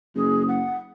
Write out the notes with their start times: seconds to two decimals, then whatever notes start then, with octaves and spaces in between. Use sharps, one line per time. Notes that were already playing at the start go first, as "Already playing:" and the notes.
0.16 F#1 G#4
0.48 F#5